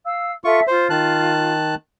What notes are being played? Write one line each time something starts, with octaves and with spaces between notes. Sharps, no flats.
F5 E6
F4 A4 E5 C#6
F4 C5
D#3 A5 F#6